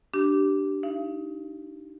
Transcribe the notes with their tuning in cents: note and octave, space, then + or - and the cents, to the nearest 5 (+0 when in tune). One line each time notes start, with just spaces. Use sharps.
D4 +0 G4 -20
D#4 +25 F5 -30